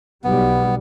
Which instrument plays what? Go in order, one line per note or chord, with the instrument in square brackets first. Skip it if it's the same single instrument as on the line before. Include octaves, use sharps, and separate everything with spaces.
[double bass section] B1 G3 [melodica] B3